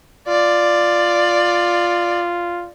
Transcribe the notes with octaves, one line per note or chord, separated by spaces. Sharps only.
F4 D5